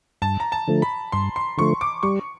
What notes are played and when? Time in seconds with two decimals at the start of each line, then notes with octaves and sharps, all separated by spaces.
0.22 G2 A5
0.40 A#5
0.52 A5
0.68 D3 F3 A3
0.82 B5
1.12 G2 C6
1.36 C6
1.58 D3 F3 A3 C#6
1.81 D6
2.03 G3 C#6